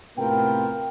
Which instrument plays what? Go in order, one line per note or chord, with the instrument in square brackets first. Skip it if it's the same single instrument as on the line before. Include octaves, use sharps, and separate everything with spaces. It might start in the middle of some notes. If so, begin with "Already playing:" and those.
[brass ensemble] A2 C3 B3 F4 A#4 G5